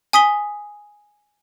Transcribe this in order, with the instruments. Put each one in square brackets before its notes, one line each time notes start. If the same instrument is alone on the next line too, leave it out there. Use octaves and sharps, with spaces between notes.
[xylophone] G#5 D#6 B6 G7